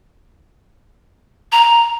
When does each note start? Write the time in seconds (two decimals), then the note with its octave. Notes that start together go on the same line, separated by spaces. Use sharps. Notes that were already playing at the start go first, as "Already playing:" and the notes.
1.52 A#5